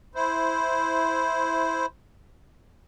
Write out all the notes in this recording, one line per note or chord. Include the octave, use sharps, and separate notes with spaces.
E4 C5